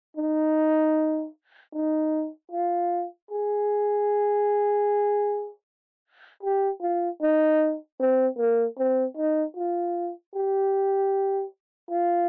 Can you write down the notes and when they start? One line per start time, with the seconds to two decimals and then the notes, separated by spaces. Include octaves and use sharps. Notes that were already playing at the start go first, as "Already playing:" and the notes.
0.17 D#4
1.73 D#4
2.51 F4
3.31 G#4
6.43 G4
6.82 F4
7.22 D#4
8.00 C4
8.38 A#3
8.78 C4
9.17 D#4
9.56 F4
10.35 G4
11.91 F4